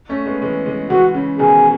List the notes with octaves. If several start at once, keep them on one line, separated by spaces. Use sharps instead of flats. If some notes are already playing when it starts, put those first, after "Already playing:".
A3 C#4
G#3 B3
E3 G#3
E3 G#3
E3 G#3 F#4
C#3
B2 D#3 G#4